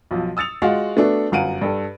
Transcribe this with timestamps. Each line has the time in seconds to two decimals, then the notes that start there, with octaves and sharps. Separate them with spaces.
0.11 B1 F3
0.37 D#6 E6 A6 C#7 F7
0.62 G#3 F4 F#4 F5 F#5
0.97 A3 B3 D4 F#4 A4
1.32 G1 F#2 F5 F#5 D7 D#7
1.61 G2 A4